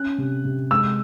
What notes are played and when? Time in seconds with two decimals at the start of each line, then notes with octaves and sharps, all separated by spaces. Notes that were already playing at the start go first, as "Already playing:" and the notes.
Already playing: C#4 F#6
0.18 C3
0.45 C3
0.71 G#3 E6